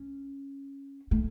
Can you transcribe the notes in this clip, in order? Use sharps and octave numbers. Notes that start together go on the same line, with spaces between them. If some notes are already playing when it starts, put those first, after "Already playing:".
Already playing: C#4
A3